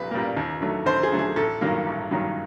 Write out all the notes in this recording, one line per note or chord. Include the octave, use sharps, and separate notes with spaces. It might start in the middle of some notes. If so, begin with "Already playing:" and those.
Already playing: B1 A#2 G3 B4
A#2 G3 A#3
D#2
D3 F#3 A3
D#2 C5
G#4
D3 F#3 A3
G#4
A1 A4
G2 D#3 F#3 A#3
A1
G2 D#3 F#3 A#3